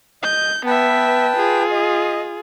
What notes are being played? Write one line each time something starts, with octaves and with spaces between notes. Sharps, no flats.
D#5 G6
B3 B4 E5 G5 A5
F4 G#4
D#5